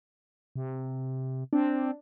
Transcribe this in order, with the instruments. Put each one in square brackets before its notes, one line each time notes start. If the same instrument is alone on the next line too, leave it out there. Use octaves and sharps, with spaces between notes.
[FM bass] C3
[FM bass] C4 [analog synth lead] D4